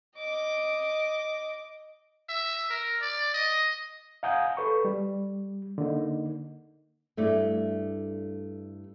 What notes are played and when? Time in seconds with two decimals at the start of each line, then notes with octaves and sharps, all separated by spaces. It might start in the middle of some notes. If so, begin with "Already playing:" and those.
0.16 D#5 D6
2.29 E5
2.70 A#4
3.01 D5
3.34 D#5
4.23 F5 F#5 G#5 A#5 D#6 G6
4.57 A4 B4 C#6
4.85 G3
5.78 D3 A#3 D#4
7.17 G2 A3 E4 D5